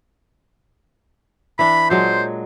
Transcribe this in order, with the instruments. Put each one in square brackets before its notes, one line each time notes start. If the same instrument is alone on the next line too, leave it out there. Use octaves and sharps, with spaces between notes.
[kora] E3 D4 [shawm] B5
[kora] A#2 F#3 G#3 [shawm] C5